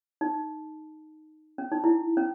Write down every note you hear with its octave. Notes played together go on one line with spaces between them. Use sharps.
D#4
C#4
D#4
E4
C#4